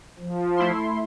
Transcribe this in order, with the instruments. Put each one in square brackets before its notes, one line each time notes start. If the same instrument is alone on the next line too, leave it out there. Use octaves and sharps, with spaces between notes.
[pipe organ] F3
[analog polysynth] A3 E4 C6